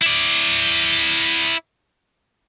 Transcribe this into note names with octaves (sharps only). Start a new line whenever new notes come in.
E4 D5